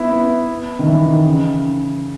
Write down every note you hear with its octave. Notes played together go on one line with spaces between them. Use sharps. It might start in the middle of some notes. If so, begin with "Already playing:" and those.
Already playing: B3 E4
B3
D#3
E3
D#3
C#3